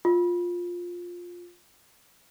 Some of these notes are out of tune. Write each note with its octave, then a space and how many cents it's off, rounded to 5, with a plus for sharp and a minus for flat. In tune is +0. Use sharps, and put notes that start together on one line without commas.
F4 +10